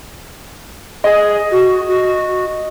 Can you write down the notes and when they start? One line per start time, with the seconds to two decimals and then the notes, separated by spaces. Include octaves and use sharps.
1.04 G#4 D#5
1.51 F#4
1.88 F#4